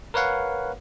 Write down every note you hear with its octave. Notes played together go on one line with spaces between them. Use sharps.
A#4 B4 C#5 F5 F#5